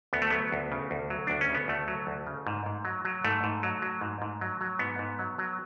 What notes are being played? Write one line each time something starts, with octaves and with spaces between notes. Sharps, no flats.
D2 B3
A3
F#3 B3
D2
C#3
D2
F#3
D2 D4
C#4
C#3 B3
D2 A3
F#3
D2
C#3
G#2
G#2
F#3
F#3
G#2 A3
G#2
F#3
F#3
G#2
G#2
F#3
F#3
G#2 B3
G#2
F#3
F#3